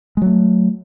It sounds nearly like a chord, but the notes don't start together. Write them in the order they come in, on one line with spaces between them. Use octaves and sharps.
G#3 F#3 A3